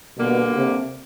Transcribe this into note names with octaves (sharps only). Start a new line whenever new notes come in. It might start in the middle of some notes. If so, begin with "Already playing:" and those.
B2 D3 G3 A#3
C3